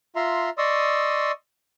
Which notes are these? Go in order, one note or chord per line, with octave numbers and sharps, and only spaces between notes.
F4 E5 A#5 C6
D5 D#5 C6 C#6 D#6 E6